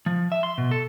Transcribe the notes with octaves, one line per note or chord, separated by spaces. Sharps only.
F3
E5
C6
B2
A4